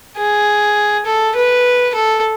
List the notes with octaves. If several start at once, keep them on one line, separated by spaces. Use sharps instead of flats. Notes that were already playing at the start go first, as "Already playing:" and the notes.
G#4
A4
B4
A4